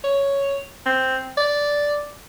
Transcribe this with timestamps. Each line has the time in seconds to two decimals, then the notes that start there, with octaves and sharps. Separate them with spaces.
0.04 C#5
0.86 C4
1.37 D5